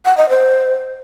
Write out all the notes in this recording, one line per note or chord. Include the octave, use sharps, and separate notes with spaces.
F#5
D#5
C5